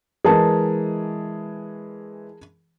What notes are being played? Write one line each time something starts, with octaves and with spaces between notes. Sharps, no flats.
E3 G#3 G#4 A#4 A5